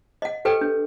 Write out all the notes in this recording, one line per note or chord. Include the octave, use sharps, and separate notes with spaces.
D#5 F#5
G4 A4 B4 G5
D4